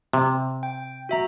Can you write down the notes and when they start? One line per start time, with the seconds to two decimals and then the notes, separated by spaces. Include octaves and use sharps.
0.13 C3
0.63 G5
1.09 F#4 E5 A#5